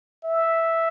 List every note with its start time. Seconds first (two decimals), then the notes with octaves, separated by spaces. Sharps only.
0.25 E5